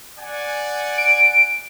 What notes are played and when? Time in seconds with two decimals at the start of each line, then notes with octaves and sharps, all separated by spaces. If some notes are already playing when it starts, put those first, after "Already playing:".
0.18 D5 F#5 G#5
0.98 D7